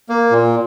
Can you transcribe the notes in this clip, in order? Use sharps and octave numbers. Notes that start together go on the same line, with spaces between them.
A#3
A#2